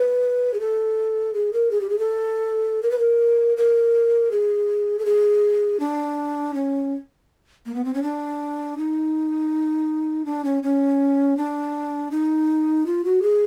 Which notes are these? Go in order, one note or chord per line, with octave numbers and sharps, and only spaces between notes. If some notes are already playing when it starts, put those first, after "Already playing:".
Already playing: B4
G#4
A4
G#4
A#4
G#4
G4
G#4
A4
A#4
B4
A#4
A#4
G#4
A4
G#4
D4
C#4
A#3
B3
C4
C#4
D4
D#4
D4
C#4
C#4
D4
D#4
F4
F#4
G#4